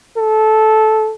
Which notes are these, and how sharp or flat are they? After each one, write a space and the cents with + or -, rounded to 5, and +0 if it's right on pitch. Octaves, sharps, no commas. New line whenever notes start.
A4 -15